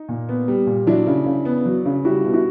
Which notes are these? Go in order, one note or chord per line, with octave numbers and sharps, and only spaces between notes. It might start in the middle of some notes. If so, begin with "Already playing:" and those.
Already playing: D#4
A#2
B3
G3
A#2
F#3 D4 E4
C#3
C#3
B3
F#3
C#3
G3 E4 F#4
B2
E4 F#4